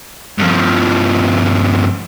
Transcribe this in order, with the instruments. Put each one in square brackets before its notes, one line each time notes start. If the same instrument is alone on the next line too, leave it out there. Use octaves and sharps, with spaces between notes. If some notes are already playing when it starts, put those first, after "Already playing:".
[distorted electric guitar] G2 F3